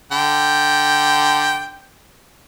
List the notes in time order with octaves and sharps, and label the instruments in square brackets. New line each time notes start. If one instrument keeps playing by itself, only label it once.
[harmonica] D3 G5